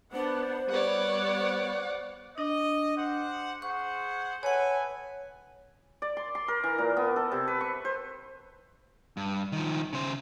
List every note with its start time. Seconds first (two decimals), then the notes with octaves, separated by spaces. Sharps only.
0.12 B3 D4 C5 F#5
0.70 G3 B3 C#5 D5 F#5
1.37 C5
2.38 D4 D#5
2.98 G4 C5 F#5
3.62 G#4 C5 F#5 C#6
4.43 A4 B4 C#5 F#5 G#5
6.02 D5
6.17 C6
6.35 C6
6.48 A#4
6.64 E3
6.78 A#2
6.97 B3
7.16 A4
7.32 C3
7.47 B4
7.61 C#6
7.85 C5
9.17 G2
9.52 D#3 F3
9.93 C#3 C5